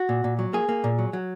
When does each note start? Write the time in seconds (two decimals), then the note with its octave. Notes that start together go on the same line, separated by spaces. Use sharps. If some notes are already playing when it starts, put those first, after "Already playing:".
Already playing: F#4
0.09 A#2
0.24 A#2
0.39 F#3
0.53 A#3 G#4
0.69 A#3
0.84 A#2
0.99 F#3
1.13 F#3